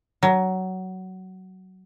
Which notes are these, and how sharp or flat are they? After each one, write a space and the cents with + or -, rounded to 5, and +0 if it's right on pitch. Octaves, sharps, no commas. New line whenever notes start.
F#3 +15